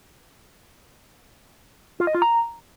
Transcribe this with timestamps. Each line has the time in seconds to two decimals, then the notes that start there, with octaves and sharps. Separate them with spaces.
2.00 F4
2.07 D#5
2.15 F4
2.22 A#5